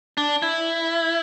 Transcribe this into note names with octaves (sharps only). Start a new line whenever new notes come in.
D4
E4